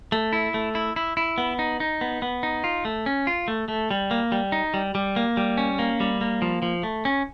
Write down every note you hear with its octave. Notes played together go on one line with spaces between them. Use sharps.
A3
E4
A3
E4
E4
E4
B3
D#4
D#4
B3
B3
D#4
F4
A3
C#4
F4
A3
A3
G3
A#3
G3
D#4
G3
G3
A#3
G3
C#4
A#3
G3
A#3
F3
F3
A3
C#4